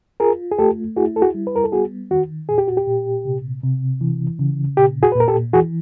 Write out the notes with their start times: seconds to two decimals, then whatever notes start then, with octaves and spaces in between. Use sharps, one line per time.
0.20 F4 G#4 A#4
0.52 G#4
0.58 A3 G4 A4
0.96 E4 F#4 G#4
1.16 A4
1.22 F#4 G#4
1.34 G3
1.47 B4
1.56 A#4
1.64 A4
1.72 B3 F#4 G#4
2.11 D#3 F#4
2.49 A#2 G#4
2.58 G4
2.68 F#4
2.77 G4
2.87 A#2
3.25 C3
3.63 C3
4.01 E3
4.39 C#3
4.77 A#2 G4
5.03 F#4 G#4
5.12 B4
5.15 A#2 A#4
5.28 G4 A4
5.53 E3 F#4 G#4